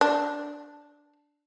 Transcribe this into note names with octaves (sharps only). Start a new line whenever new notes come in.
D4